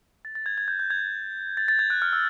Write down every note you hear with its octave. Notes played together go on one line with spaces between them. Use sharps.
A6
A6
G#6
G#6
G6
G6
G#6
A6
A6
G#6
F#6
F6
E6